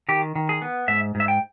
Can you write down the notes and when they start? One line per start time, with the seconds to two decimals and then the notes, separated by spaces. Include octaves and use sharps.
0.09 D#3 G4
0.35 D#3
0.49 G#4
0.62 B3
0.88 G#2 E5
1.15 G#2
1.20 E5
1.28 G5